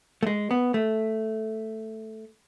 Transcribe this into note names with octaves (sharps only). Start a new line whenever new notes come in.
A3
G#3
B3
A3